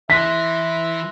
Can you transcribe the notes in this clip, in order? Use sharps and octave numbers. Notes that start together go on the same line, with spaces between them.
E3 E5 C6 F#6 A#6 B6